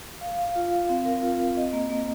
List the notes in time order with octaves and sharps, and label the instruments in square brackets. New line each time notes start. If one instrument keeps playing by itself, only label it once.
[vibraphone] F5
F5
F4
F5
C4
A#4
F4
C4
D#5
A#3
A#3